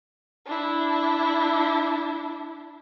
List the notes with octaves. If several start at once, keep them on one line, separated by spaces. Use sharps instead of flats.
D4 E4